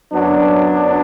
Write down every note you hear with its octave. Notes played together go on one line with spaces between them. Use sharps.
F#2 F#3 B3 D4